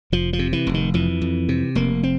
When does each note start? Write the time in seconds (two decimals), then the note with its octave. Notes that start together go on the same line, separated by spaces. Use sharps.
0.12 F1 F3
0.33 F3
0.39 C3
0.53 E3
0.67 F1
0.74 D#3
0.94 F2 E3
1.22 F2
1.49 C3
1.75 F1 A#3
2.03 C4